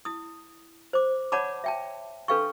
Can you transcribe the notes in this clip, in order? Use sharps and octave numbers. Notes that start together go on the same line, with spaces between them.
E4 D#6
C5 D6
C#5 D5 F#5 A5 B5 D6
E5 G5 A5
D4 A4 B4 F5 G5 C#6